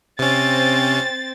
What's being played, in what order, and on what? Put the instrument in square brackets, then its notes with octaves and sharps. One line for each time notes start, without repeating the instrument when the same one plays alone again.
[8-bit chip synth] C3 C#4 [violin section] C4 A6